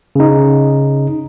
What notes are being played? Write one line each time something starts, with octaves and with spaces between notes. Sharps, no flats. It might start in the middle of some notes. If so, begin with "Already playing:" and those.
C#3 D#4